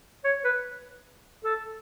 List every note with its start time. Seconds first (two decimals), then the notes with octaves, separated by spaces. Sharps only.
0.24 C#5
0.45 B4
1.45 A4